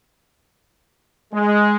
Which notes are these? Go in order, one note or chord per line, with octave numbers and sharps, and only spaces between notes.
G#3